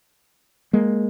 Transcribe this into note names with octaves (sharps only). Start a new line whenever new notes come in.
G#3 A#3